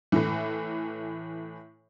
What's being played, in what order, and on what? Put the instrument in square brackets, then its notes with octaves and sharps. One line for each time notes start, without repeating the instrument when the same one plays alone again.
[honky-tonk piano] A2 E3